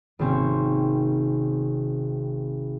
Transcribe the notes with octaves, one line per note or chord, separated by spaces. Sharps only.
G#1 C3 A#3 C4 C#4 C#6